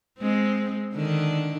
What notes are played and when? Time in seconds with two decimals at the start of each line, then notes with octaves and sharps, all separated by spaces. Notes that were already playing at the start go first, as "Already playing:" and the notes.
0.19 G#3 C4
0.94 D3 D#3 D4